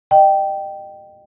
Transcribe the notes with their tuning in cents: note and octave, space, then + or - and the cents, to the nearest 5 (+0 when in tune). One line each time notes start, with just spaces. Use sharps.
D#5 -35 G5 -10